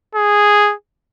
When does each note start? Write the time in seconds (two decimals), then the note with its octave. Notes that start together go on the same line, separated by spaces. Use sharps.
0.15 G#4